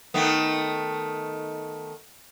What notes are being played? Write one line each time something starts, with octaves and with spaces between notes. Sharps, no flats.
D#3 A3 B3